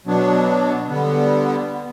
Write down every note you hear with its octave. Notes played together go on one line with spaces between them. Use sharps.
B2 F#3 B3 D4
D3 G3 B3